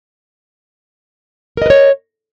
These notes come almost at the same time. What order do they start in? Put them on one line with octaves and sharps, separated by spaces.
A#4 D#5 B4 C#5